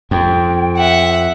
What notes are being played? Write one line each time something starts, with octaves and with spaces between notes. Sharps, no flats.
F2 G5
E5 F#5